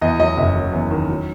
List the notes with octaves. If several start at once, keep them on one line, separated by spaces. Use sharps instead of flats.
E2 D#5
F#3 D#5
F#1 E5
F#3
E2
D#3
F#3